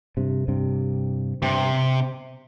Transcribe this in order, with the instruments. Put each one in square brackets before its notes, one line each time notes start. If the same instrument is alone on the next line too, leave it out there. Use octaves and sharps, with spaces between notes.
[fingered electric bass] G2 C3
G2 C3
[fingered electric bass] G2 [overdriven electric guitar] C3